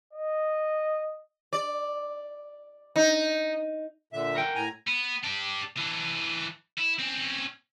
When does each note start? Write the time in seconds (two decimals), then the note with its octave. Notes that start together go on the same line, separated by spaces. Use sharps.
0.13 D#5
1.53 D5
2.96 D#4
4.13 A#2 D3 E5
4.35 A#4 F#5 G5
4.55 A2 G#5 A#5
4.87 B3
5.23 D4 G4
5.78 E3 D4
6.78 E4
6.99 C4 C#4